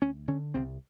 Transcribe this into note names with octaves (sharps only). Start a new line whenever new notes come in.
D2 C#4
D3 C#4
C2 C4